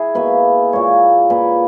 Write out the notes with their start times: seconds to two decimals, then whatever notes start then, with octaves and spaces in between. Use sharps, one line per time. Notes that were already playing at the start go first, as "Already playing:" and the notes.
Already playing: E4 G#4
0.15 B2 A#3 B4
0.73 A#2 A#3 C#5
1.30 A#2 A#3 B4